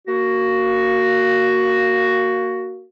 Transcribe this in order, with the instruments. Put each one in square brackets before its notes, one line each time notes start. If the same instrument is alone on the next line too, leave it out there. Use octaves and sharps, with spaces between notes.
[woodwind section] A#3 F#4